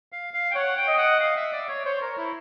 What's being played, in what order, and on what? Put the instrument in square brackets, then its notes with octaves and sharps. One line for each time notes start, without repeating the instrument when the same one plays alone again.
[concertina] F5
F5
G5
[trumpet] C#5 [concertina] F#5
[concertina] G5
[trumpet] D#5
[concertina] F#5
F5
E5
D5
C#5
[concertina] C5 [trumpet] C#5
[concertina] A#4
E4